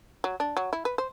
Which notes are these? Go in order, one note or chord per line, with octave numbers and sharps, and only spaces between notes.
F#3
D4
F#3
E4
B4
C5